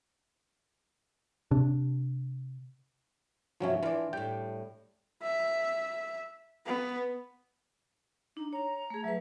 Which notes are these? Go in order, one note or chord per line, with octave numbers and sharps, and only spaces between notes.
C3 D4
G2 C3 F3 F#3 C#4 E4
E3 F3 D5
A2 G3 G5
E5
B3
D4 D#4
C#5 A#5
A3 G#4
F#3 B4 E5